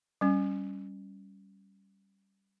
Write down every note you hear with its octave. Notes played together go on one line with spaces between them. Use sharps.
G3 C#4